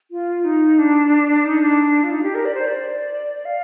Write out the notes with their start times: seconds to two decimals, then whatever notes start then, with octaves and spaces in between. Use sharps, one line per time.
0.11 F4
0.44 D#4
0.79 D4
1.45 D#4
1.62 D4
2.04 F4
2.11 D#4
2.23 G4
2.35 A#4
2.45 D5
2.54 C5
2.65 D5
3.45 F5